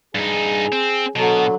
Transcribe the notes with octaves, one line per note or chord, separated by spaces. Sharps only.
G2 D#4 G#4
C4
B2 D3 F#3